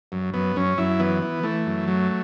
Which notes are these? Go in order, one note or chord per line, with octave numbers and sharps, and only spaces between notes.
F#2
F#2 B3
F#2 C#4
F#2 E4
E3 B3
E3
E3 A3
F#2
F#3